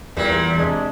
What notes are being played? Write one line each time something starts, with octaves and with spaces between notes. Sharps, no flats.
E2 A#2 G3
C3 G#3 D4